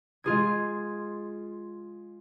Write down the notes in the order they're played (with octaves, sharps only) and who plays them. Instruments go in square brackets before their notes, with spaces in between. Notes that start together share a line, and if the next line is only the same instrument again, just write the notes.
[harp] G#3 F4 G#4 G#6